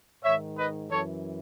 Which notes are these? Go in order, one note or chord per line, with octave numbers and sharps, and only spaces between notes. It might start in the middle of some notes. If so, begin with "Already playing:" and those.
G#2 D#3 C#5 E5
B4 D#5
F#2 E3 A4 C#5